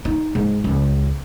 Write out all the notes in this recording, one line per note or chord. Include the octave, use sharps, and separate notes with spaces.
D#4
G#2
C#2